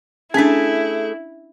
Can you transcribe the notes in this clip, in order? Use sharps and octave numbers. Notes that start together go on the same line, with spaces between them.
A3 C#4 D4 E4 G#4